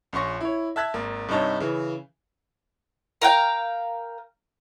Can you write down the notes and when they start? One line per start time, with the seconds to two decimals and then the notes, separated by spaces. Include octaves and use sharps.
0.13 A#1 C#4 C6 C#6 A#6
0.41 E4 C#5
0.76 E5 A5 F#6 G#6 B6
0.94 G#1 A#3
1.28 G2 C3 C#4 D#4 C#5 A5
1.60 C#3 E3
3.22 A#4 F5 G5